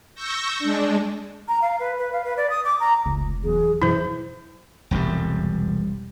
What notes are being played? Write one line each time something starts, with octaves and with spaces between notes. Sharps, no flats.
C#6 E6 G6 A#6
G#3 D4
A#5
F5
B4
B4
F5
B4
D5
D#6
D6
A#5
F1 C#2
E2 F#3 G#4
F#2 B2 E3 E4 C5
E1 C2 F2 G3